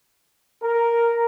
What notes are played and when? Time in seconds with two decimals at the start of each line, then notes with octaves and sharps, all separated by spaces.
0.63 A#4